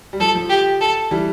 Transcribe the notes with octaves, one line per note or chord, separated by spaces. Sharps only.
G3
F3 A4
F3
G4
A4
E3 G3